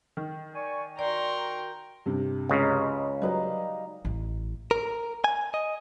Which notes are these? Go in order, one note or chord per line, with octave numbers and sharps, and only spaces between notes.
D#3
D5 G#5 C#6
F#4 A#4 D5 G5 A#5 C6 C#6
G2 C3
C#2 C#3 G#3 A#5
F#3 G3 D#4 B4 C#5 F5
A1
A#4
G#5
D#5